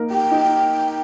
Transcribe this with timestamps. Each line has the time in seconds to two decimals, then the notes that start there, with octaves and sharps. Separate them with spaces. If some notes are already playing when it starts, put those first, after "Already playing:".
Already playing: A#3 D#4 A#4
0.10 G4 G5
0.31 D#4